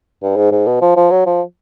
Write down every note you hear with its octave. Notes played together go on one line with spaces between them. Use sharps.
G2
G#2
G#2
B2
F3
F3
F#3
F3